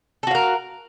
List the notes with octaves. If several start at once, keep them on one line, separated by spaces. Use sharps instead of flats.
F#4 A4 A#4 F5